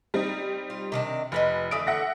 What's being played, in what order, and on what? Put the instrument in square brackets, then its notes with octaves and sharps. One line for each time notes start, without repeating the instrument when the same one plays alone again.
[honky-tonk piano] G3 C4 D#4
[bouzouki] F4
C3 D#3 D4
[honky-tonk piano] F1 [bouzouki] F4 B4 D#5
[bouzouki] D3 E3 A3 [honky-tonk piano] E5 D#6 D7
[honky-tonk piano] E5 F#5 A#6